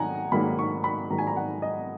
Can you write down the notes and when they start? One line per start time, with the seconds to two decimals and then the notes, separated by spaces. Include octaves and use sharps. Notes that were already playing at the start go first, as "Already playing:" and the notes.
Already playing: G#2 D#3 F#3 A#3 F#5 G#5 A#5
0.32 G#2 D#3 F#3 A#3 B5
0.59 C#6
0.84 B5
1.10 G#2 D#3 F#3 A#3 A#5
1.18 G#5
1.27 A#5
1.36 F#5
1.62 D#5